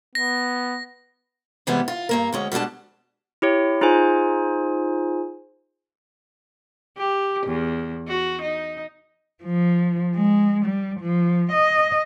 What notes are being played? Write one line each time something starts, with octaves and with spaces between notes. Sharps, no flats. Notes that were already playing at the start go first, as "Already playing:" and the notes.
B3 A#6
C3 E3 G3 G#3 B3
F4
G2 A#3 A#4
D2 G#3 C#4
B2 G3 G#3 D4 A5
E4 G4 C#5
D#4 F4 G#4 C5 G#5
G4
E2
F#4
D#4
F3
G#3
G3
F3
D#5